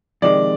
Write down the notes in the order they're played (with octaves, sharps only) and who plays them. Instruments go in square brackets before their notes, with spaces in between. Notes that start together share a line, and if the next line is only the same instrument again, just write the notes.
[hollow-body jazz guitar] F2 C3 D#3 G#3 [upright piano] D5